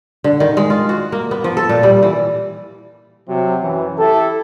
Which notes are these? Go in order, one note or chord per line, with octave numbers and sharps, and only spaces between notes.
D3
D#3
G#3
F4
F#4
A#3
B3
F3
A4
A#2
G3
E3
C3 F#3
F#2 E3
E4 G4 A4